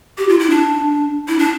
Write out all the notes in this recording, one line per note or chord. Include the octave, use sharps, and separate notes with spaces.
G4
F4
E4
D4
E4
D4